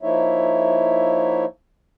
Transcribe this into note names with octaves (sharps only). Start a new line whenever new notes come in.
F3 A#3 D#4 E4 C#5 E5